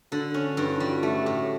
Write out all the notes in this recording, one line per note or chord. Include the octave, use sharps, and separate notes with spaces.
D3 F#4
C#4
G2 E4
D#4
G3 F4
F#4
A3 F#4
G4
A2 G4
F#4